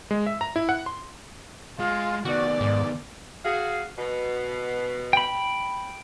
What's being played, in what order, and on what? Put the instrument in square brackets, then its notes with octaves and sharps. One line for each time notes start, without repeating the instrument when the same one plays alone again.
[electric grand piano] G#3
E5
A#5
E4
F#5
C6
[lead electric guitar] G#3 [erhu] F4
[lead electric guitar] D#3 B3 [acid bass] F#4 [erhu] D5
[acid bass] G#2
[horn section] F#4 G#4 F5
B2
[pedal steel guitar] G5 B5